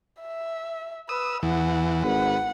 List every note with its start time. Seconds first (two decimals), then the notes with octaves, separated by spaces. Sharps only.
0.21 E5
1.09 B4 D#6 E6
1.43 E2 E3 F#5
2.03 G#1 B4 F#5